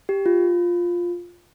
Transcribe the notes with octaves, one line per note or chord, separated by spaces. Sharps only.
G4
F4